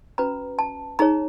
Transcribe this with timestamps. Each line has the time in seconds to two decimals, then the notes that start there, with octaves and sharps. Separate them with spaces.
0.18 C#4 F#4 B4 A#5
0.59 A5
0.99 D#4 G#4 C#5 A#5